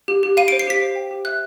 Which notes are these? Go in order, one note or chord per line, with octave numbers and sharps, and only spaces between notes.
G4
G4
F5 D#7
D7
C5
C7
G4 B6
C5
G5
G4
E5 F#6